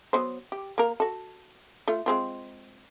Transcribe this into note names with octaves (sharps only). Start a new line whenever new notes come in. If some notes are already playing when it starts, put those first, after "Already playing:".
F#3 B3 C5
G4
A#3 A#4
F#4 A4
A3 F4
G#3 C4 F4